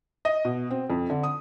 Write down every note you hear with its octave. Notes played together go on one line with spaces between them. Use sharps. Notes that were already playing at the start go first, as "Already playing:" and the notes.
D#5
B2
C4
F2
D3
D#6